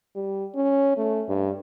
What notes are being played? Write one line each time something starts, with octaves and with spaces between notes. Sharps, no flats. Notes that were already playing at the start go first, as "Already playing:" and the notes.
G3
C#4
A3
G2